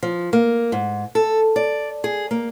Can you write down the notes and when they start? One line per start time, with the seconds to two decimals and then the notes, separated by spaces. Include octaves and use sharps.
0.03 F3
0.33 A#3
0.72 G#2
1.15 A4
1.56 D5
2.04 G#4
2.31 A#3